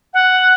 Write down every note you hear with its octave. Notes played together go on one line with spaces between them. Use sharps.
F#5